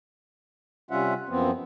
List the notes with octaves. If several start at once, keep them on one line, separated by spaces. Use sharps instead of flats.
C3 G3 C#4 F4 E5 F#5
F#2 F3 B3 C4